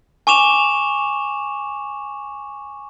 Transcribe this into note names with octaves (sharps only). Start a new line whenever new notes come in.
G#5 C#6 D6 E7 F7